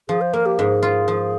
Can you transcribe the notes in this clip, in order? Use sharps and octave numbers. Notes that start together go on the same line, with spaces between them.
F3 G#4
C5
A#3 A#4
G4
G#2 G#4
F4
F3